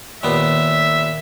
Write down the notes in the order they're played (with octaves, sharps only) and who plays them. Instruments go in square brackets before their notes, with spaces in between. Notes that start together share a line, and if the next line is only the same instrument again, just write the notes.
[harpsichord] D#2 A#2 B3 [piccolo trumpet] E5